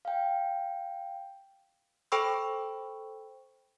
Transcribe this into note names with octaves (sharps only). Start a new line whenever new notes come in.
F5 G5
A4 C5 G5 B5 C#6 E6